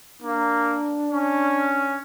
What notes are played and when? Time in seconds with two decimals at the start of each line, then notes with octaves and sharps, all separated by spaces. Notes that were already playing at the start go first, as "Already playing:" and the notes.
0.22 A#3 D4
1.12 C#4